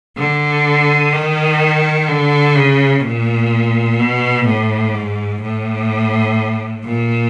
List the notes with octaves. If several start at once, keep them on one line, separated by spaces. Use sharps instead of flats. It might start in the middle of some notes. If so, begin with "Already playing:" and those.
D3
D#3
D3
C#3
A#2
B2
A2
G#2
A2
A#2